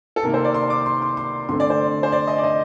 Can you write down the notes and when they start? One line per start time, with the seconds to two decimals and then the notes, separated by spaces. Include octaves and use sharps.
0.16 A4
0.23 C3 D#3 A#3 A#4
0.34 C5
0.44 D5
0.54 C6
0.70 D6
0.86 C6
1.02 C6
1.17 C6
1.49 D3 A3 C4 C6
1.60 D5
1.70 C5
2.03 C5
2.12 D5
2.27 D#5
2.38 D5
2.44 D#5